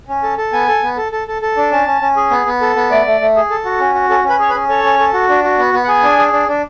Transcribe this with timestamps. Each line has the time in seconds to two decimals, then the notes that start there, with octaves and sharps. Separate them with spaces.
0.08 C#4
0.23 A4
0.38 A4
0.53 B3 G#5
0.68 A4
0.83 B3
0.97 A4
1.12 A4
1.28 A4
1.42 A4
1.57 D4
1.71 C#4 A5
1.87 C#4
2.01 C#4
2.16 G#4
2.31 B3
2.46 B3
2.61 A4
2.76 B3
2.91 A3 D5
3.06 A3
3.21 A3
3.36 G#4
3.50 A4
3.65 F#4
3.80 C#4
3.94 F#4
4.10 C#4 A4
4.24 C#4
4.29 B4
4.39 G#4 C#5
4.49 B4
4.55 C#4
4.69 A4 C#5
4.83 C#4
4.99 A4
5.14 F#4
5.29 D4
5.43 F#4
5.58 B3
5.73 B3
5.84 F#5
5.88 G#4 G#5
6.03 D4
6.18 G#4
6.33 D4
6.48 D4